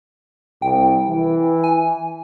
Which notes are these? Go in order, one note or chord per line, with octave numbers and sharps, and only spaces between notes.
C2 G5
E3
G#5